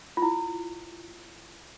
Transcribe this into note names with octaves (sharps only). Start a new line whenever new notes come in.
F4
E4